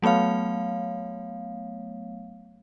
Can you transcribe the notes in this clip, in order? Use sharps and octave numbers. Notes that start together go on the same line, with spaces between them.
F#3 A3 B3 C#5 F5